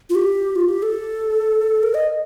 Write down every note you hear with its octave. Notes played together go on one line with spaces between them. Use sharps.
F4
G4
F4
G4
A4
A#4
D#5